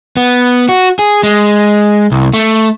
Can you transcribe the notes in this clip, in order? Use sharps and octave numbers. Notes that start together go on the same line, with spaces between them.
B3
F#4
G#4
G#3
C2
A3